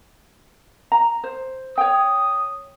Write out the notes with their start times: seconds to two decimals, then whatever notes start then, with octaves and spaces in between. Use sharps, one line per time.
0.92 A#5
1.24 C5
1.78 C#5 G5 D#6